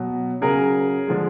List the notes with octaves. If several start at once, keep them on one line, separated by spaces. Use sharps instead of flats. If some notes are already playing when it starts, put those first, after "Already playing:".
Already playing: B2 F#3
C#3 F#3 G#4 A#4
D3 F3 G#3